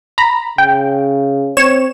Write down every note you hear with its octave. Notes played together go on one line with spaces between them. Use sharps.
A#5 B5
C#3 G5
C4 C#5 E7